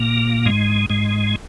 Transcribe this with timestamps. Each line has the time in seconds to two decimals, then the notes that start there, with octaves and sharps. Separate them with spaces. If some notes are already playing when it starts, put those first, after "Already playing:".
Already playing: A#2 A#3
0.46 G#2 G#3
0.90 G#2 G#3